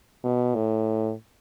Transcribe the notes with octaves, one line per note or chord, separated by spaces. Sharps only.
B2
A2